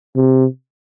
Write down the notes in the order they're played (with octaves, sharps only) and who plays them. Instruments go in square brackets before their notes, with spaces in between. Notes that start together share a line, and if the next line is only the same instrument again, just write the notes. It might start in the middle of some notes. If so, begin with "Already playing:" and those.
[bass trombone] C3